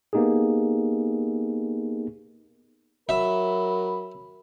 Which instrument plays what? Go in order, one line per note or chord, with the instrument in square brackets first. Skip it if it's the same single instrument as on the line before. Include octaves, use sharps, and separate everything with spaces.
[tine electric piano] A#3 B3 D#4 G4 G#4
[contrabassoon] F#3 [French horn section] A#4 [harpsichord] E5 [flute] B5